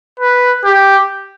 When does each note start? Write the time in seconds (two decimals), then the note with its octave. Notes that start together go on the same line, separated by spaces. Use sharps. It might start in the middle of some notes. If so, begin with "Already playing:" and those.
0.20 B4
0.65 G4